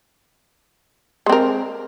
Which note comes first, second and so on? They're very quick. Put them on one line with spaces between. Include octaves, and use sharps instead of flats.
G#3 C4 A#4